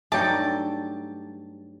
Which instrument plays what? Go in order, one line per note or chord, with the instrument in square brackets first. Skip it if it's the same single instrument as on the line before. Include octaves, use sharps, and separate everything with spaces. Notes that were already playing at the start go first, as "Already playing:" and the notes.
[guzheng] G2 F#3 G3 [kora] A3 D#4 [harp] G5 D6 [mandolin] A5